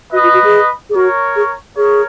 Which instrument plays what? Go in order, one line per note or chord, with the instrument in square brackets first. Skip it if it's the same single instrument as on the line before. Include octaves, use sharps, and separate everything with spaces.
[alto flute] F#4 [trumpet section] B4 D#5
[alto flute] F4
F#4
G#4
G#4
[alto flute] F#4 [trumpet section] A#4 C#5
[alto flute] G#4
[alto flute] G#4 [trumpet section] A#4 C#5